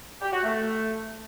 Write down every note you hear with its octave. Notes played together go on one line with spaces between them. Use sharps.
G4
F#4
A3